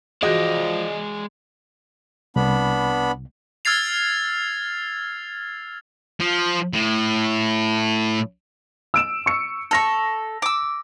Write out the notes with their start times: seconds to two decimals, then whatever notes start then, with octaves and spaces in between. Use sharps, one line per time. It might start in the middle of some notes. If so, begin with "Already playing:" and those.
0.23 E3 F3 G#3 F#4 G#4 D5 D#5
2.36 C2 B3 D4 B5
3.65 E6 F6 G#6 A6 C7 F7
6.20 F3
6.74 A2
8.94 E6 D7 E7
9.26 C#6 C#7
9.71 A4 C#6 A#6 F7
10.42 D6 E6